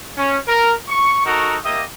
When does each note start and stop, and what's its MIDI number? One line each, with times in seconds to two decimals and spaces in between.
0.17 0.37 61
0.47 0.72 70
0.88 1.21 85
1.25 1.57 63
1.25 1.57 66
1.25 1.57 69
1.25 1.57 70
1.25 1.57 85
1.64 1.83 58
1.64 1.83 67
1.64 1.83 75
1.64 1.83 76
1.64 1.83 87